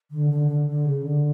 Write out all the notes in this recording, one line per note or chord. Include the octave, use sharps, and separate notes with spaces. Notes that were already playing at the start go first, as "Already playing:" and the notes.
D3
D3
D3
D3
C#3
D3